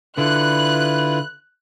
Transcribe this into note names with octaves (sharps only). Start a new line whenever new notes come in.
D3 E4 F4 B4 F#6